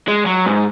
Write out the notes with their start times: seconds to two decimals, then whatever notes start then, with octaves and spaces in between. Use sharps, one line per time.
0.08 G#3
0.26 F#3
0.46 G#2